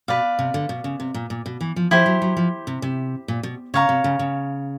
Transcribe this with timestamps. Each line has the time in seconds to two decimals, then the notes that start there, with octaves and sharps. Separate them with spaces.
0.08 B2 B4 D5 F5
0.39 C3
0.54 D3
0.69 B2
0.84 C#3
1.00 C3
1.14 A#2
1.30 A#2
1.46 B2
1.61 E3
1.76 F3
1.91 F3 E4 G4 C5
2.06 F#3
2.22 F#3
2.37 F3
2.67 C3
2.82 C3
3.28 A#2
3.43 B2
3.74 C#3 C#5 F5 A#5
3.89 C3
4.04 C#3
4.19 C#3